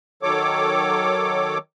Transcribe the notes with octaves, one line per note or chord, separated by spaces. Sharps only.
D#3 F#3 A4 C#5 D6